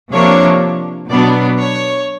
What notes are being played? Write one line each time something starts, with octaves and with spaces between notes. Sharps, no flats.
C3 F3 A#3 D4 C#5
B2 F#3 B3 D4 D5
C#5